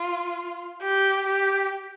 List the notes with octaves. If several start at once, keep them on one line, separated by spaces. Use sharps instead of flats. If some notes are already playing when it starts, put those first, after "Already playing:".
Already playing: F4
G4
G4